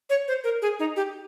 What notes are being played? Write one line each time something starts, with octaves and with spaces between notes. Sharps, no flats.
C#5
C5
A#4
G#4
D#4
G4